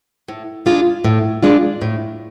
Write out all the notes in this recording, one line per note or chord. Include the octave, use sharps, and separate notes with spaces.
A2
G#3 D4 F4
A2
G#3 D4 F4
A2